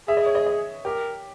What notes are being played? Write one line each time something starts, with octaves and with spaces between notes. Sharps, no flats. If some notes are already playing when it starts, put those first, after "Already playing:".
G#4 E5
D#5
C#5
D#5
D#5
G4 A#4